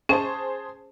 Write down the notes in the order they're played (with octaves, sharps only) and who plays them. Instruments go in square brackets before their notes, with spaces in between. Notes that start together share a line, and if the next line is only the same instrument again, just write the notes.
[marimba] C#4 [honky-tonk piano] G#4 C5 A5